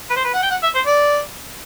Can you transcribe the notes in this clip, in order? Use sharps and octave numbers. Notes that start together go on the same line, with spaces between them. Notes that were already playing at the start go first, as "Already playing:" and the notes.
B4
C5
B4
F#5
G5
F#5
E5
C5
D5